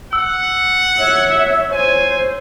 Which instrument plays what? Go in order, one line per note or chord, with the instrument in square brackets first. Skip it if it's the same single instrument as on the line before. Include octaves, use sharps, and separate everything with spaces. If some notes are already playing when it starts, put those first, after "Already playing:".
[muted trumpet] F#5 [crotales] E6
[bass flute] C#5 [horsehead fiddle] E5
[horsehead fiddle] C5 [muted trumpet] G#5